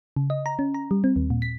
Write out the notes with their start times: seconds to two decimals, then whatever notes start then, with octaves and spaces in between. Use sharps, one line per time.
0.16 C#3
0.30 D#5
0.46 A#5
0.59 C#4
0.74 A#5
0.91 G3
1.04 C4
1.16 D#2
1.30 A#2
1.42 B6